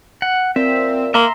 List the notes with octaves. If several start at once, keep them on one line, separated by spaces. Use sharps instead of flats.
F#5
A#2 C4 E5
A#3 E5 A#5 C6